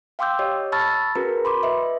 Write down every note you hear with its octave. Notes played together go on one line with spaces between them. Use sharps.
F5 G5 C6 D6 E6 G6
G4 C#5 D#5
A5 B5 C#6 E6 F6 A6
C#4 F#4 G#4 A#4 B4 A#5
B5 C6 D6
B4 D#5 E5